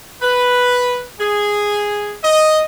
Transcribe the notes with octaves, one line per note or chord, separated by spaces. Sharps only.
B4
G#4
D#5